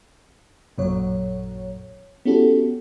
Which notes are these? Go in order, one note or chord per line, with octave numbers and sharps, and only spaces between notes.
A1 F#2 A#2 F#3 C#5
B3 C#4 E4 F#4 G4 A4